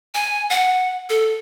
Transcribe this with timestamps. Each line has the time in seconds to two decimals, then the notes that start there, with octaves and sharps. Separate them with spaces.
0.15 G#5
0.50 F#5
1.09 A4